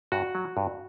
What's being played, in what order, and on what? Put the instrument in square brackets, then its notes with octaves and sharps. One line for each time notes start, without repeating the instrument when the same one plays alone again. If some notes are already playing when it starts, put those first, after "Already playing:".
[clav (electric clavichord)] G2 F#4
F#3
G2